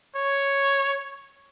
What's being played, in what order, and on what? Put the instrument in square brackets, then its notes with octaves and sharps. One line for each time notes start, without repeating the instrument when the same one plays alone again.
[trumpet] C#5